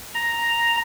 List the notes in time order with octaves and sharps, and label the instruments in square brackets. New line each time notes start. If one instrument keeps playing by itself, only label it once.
[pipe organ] A#5